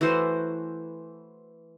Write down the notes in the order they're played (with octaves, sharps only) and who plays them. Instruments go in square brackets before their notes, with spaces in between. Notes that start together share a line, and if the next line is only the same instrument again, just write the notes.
[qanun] E3 A3 F#4 C5